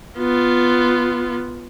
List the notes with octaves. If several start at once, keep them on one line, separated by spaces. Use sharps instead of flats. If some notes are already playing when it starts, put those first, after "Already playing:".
B3 F4